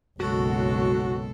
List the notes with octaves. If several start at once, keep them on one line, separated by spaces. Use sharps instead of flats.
F#1 B1 G#3 F#4 A4